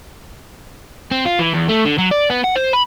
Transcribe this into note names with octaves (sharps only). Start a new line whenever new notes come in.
C4
F4
E3
E2
A3
D3
F#3
D5
B3
F#5
C5
B5